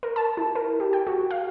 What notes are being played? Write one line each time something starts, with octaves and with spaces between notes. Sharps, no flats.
A#4
A5
E4
A#4
G4
G5
F#4
F5